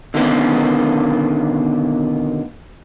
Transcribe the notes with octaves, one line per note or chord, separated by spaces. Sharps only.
B2 D3 D#3 A#3 B3 C#4